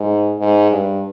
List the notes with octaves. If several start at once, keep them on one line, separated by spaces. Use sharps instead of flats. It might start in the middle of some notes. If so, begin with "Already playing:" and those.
Already playing: G#2
G#2
G2